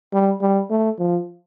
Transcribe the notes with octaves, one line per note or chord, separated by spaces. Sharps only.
G3
G3
A3
F3